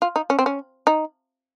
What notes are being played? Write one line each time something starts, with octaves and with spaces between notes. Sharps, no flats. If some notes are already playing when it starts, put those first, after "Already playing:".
F4
D#4
C#4
C4
C#4
D#4